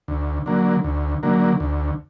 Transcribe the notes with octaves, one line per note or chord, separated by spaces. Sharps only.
D2
D3 F#3 A#3
D2
D3 F#3 A#3
D2